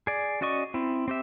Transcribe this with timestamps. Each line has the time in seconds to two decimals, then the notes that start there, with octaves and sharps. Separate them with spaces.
0.07 G#4 D5
0.41 C#4 F#4 D5 D#5 C#6
0.74 C4 E4
1.08 C4 G4 E5